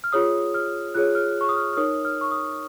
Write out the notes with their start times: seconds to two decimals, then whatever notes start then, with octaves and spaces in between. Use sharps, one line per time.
0.04 F6
0.12 F4 G#4 C#5 D#6
0.54 F6
0.94 F4 G#4 C#5 F#6
1.15 F6
1.41 C#6
1.49 D#6
1.56 F6
1.73 F6
1.77 D#4 A#4 C#5 D#6
2.05 F6
2.21 C#6
2.31 D#6